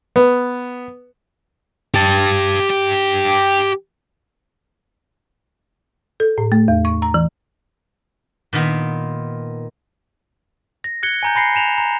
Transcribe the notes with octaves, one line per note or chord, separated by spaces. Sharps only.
B3
G4 A5
A4
A2
A3
E2
C#6
A#5
E3
A#2 D#3 B3
A#6
F#6 G#6 C#7 G7
G#5 A#5 G6
G#5 B5 A#6 C7 C#7
G#5 E7 F7
A#5